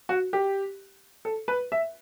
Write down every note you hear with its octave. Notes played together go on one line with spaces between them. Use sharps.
F#4
G4
A4
B4
E5